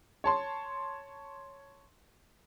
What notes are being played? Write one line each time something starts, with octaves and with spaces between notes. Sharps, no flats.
C#5 A5 C6